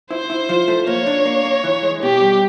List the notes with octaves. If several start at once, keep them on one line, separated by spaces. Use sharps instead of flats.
E4 C5
E4
F3
A3
A#3 C#5
D4
A#3
A#3
E3
G#3
B2 G4
G3